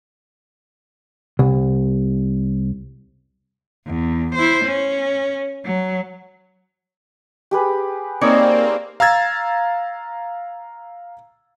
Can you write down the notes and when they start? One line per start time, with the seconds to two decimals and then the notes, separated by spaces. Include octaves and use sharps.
1.39 C2
3.86 E2
4.35 E4 C5
4.64 C#4
5.65 F#3
7.51 G4 G#4 B4
8.21 A#3 C4 D#4 C#5 D5
9.00 F5 A#5 E6 G#6 A6